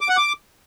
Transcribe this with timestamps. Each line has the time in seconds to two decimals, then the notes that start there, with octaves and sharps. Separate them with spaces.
0.01 D6
0.09 F#5
0.17 D6